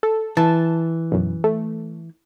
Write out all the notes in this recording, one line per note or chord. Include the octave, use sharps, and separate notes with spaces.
A4
E3 A5
B1 F#2
A3